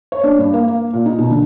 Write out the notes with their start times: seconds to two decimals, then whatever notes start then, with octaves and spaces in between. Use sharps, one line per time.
0.12 C#5
0.24 D4
0.39 G2
0.54 A#3
0.68 A#3
0.93 A#2
1.06 D#4
1.19 B2
1.30 D3